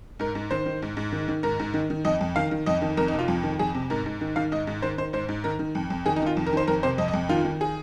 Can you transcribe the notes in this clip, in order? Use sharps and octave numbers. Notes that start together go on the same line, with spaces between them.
G#2 A#4
G#2
D#3 C5
D#3
G#2
G#2
D#3
D#3
G#2 A#4
G#2
D#3
D#3
F2 D#5
F2
D#3 F5
D#3
F2 D#5
D#3
F2 A#4
D#4
C3
F4
F2
D#3
F2 G#4
C3
G#2 A#4
G#2
D#3
D#3 F5
G#2 D#5
G#2
D#3 C5
D#3 C5
G#2 C5
G#2
D#3 A#4
D#3
F2
F2
D#3 G#4
D#4
D#3 F4
F2
A#4
D#3 C5
F2 A#4
C3 C5
F2 D#5
D#5
F2
D#3 F4
D#3
G#4